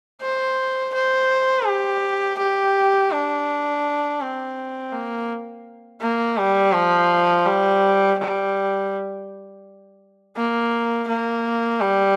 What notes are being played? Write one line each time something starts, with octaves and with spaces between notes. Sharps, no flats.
C5
C5
G4
G4
D4
C4
A#3
A#3
G3
F3
G3
G3
A#3
A#3
G3